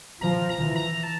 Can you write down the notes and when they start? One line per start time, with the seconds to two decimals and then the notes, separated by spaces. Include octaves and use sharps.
0.21 F3 A#5
0.49 A#5
0.62 E3
0.76 A#5
1.03 A5